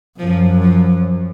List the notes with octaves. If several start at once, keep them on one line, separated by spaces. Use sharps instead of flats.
F#2 F3
F3